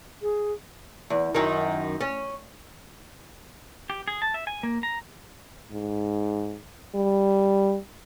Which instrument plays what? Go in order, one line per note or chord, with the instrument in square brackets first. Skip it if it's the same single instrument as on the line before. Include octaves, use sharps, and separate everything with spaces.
[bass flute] G#4
[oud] E2
F#2 D#3
C#4
[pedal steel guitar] G4
G#4
A5
E5
G#5
A#3
A#5
[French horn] G#2
G3